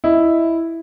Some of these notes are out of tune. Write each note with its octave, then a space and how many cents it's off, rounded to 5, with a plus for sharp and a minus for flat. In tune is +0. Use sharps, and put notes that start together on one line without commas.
E4 +0 D#5 +0